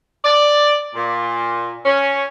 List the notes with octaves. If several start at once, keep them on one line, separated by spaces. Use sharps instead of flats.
D5
A#2
C#4